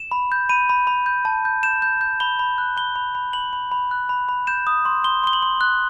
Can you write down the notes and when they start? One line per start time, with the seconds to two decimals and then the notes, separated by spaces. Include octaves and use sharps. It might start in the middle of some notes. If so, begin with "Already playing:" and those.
Already playing: E7
0.11 B5
0.32 G6
0.49 B5 D#7
0.69 B5
0.87 B5
1.06 G6
1.25 A5
1.45 G6
1.63 G6 E7
1.82 G6
2.01 G6
2.20 B5 G7
2.39 B5
2.58 F#6
2.77 B5 G7
2.96 B5
3.15 B5
3.33 B5 F#7
3.53 B5
3.72 B5
3.91 F#6
4.09 B5
4.29 B5
4.47 G6 E7
4.67 D#6
4.85 C6
5.04 C6 G7
5.23 C6 G7
5.33 F#7
5.42 C6
5.61 F#6